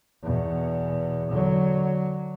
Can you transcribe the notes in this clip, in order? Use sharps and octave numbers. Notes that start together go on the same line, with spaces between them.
E2 B2
D3 F#3